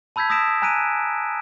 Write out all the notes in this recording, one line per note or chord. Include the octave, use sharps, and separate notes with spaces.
A5 B5 E6 G6 G#6 B6
D#6 E6 A#6 B6 D7 E7
G#5 A#5 F#6 B6 D7 D#7